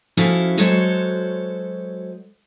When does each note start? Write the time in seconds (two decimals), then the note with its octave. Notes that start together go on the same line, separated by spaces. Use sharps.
0.17 F3 C#4 E4 F#4 A4 F5
0.57 F#3 G#3 F#4 A4 C5 C#5